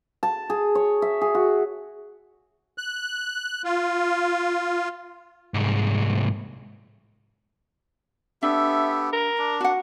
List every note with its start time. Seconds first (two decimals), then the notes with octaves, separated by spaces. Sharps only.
0.23 A5
0.50 G#4
0.75 C#5
1.02 E5
1.21 G#4
1.35 F#4
2.78 F#6
3.64 F4
5.54 C2 G#2
8.43 B3 D4 G4 A4 E5
9.13 A#4
9.38 D4
9.61 F#4 F#5